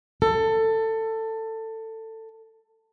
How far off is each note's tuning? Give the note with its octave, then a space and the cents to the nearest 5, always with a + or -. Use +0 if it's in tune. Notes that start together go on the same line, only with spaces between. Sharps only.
A4 +20